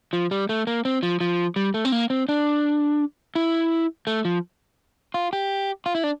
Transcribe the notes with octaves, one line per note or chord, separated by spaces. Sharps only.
F3
G3
A3
A#3
C4
F3
F3
G3
A3
C4
A#3
C4
D4
E4
A3
F3
F4
G4
F4
E4
D4